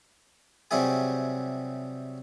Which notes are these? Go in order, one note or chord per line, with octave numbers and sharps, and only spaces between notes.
C3 F#3 G3 E4 G#4 G#5